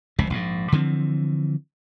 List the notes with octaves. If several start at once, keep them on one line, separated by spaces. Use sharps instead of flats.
F1 C#2 C3
A#1 G#2
D3 E3 F3 C4